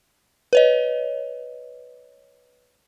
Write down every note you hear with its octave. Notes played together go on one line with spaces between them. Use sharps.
B4 C#5 D#5